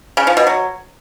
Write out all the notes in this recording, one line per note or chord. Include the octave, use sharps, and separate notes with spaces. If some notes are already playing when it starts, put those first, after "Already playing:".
C#3
F3
B2
F#3